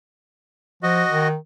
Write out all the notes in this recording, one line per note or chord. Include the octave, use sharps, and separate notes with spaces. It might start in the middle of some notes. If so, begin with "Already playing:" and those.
F3 F#4 D#5
D#3